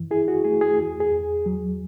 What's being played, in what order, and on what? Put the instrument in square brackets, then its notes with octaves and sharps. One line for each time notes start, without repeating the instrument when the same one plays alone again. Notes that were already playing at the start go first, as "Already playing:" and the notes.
Already playing: [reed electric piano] F#2 E3
E4 G#4
F#4
A3 G#4
G#4
E2
G#4
E2
F#3